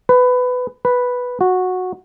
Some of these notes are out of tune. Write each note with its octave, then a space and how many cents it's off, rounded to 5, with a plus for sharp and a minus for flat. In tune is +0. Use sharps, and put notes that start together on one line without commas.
B4 +15
B4 -5
F#4 -10